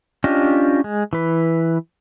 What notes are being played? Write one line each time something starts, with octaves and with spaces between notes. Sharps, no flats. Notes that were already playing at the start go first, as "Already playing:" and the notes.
C#4 D4 F4 G4 D#5
G#3
E3 B4